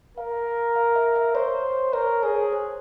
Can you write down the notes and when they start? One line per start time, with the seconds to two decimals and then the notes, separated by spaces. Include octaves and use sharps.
0.18 A#4 F5
0.76 F5
0.96 E5
1.16 E5
1.35 C5 C#5
1.93 A#4 C#5
2.23 G#4 C#5
2.52 C5